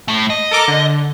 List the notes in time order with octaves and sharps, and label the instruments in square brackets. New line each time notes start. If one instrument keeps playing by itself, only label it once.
[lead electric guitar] A2 A3
D#5
[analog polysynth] A4 A#4 D6
D3